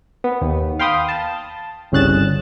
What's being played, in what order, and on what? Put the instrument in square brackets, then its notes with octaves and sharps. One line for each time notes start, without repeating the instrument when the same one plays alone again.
[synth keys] B3
D#2
F5 G5 B5 C6 D#6
A5
G1 C2 C#3 F#6 A6 E7